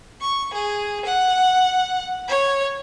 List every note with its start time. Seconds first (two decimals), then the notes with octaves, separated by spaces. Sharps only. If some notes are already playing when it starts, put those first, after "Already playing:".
0.21 C#6
0.54 G#4
1.05 F#5
2.28 C#5